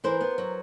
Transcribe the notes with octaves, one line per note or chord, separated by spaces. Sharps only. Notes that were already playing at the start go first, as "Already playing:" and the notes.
E3 A#4 C5
B3
F#3